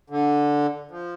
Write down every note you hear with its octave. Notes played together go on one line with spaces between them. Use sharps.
D3
F3